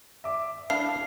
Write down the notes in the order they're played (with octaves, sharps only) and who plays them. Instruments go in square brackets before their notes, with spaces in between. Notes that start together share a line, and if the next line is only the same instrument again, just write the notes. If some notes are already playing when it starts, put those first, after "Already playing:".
[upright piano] E5 D6
[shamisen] D4 E4 [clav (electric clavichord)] F5 [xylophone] C7